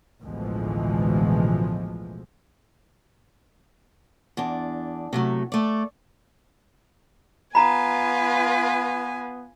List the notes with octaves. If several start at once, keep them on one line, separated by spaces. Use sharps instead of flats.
A1 D2 B2 E3 F3 G#3
E2 D4
C3 F#3 A3
A3 D5
B3 F4 B4 G#5 A#5 B5